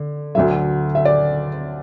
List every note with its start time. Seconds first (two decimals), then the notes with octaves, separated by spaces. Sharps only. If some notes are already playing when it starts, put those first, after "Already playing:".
Already playing: D3
0.35 D2 D3 F#3 E5
0.95 E5
1.05 D5